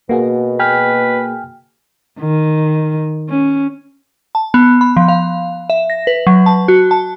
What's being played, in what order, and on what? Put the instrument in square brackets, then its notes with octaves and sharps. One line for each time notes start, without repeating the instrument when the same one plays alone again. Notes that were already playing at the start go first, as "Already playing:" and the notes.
[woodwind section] B2 [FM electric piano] A#3 F#4 G#4
[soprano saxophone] B4 [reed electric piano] G5 G#5 F6
[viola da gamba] D#3
C#4
[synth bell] A5
B3
B5
F3
F5
E5
A#6
B4
F#3
A5
F#4
A5